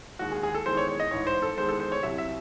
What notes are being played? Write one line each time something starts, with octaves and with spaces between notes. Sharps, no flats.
D#2 D#3 G#3 F#4
G#4
G#4
A4
E2 D#3 G#3 C5
C#5
C#5
D#5
A1 G#2 E3 C#5
C5
A4
E2 D#3 G#3 C5
A4
C5
C#5
C2 C3 F#3 E5
E5